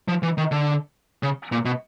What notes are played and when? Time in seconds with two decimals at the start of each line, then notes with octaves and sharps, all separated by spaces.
0.08 F3
0.23 E3
0.38 D#3
0.52 D3
1.23 C#3
1.52 A#2
1.65 B2